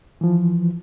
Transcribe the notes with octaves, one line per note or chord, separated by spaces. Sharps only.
E3 F3